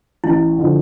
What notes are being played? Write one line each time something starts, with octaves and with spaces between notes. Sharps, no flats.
A1 E4
D3 F3